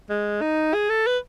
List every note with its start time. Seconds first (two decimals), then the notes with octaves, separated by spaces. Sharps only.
0.10 G#3
0.41 D#4
0.74 G#4
0.90 A4
1.07 B4